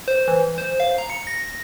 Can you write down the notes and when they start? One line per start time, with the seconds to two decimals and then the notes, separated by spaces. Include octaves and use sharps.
0.08 C5
0.28 E3
0.58 C5
0.80 F5
0.98 A#5
1.10 C#7
1.27 A#6